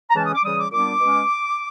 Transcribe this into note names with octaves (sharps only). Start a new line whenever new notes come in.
A#5
C#3 E3 G#3 C#4 A5
D#6
D6
C#3 E3 G3 D#6
D6
A#2 G3 B3 D4 D6
B2 G#3 C#4